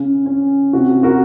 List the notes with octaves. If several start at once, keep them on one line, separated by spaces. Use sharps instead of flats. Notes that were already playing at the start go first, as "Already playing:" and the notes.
Already playing: C#3 C#4
C#4
C3 F#4
F#4 A#4